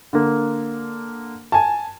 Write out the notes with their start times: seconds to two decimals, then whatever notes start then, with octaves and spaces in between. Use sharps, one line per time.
0.13 D3 A#3
1.52 G#5 A5